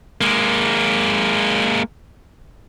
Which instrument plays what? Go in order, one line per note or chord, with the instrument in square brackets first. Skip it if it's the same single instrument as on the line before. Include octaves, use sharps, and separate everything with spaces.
[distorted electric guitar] G#3 A#3